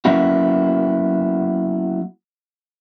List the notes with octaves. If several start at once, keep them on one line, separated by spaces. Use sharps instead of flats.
F#3 A#3 B3 C#4 E4 F#4